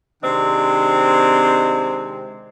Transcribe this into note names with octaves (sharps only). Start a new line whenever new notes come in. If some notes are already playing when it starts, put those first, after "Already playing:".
C3 D#3 G#3 C4 D4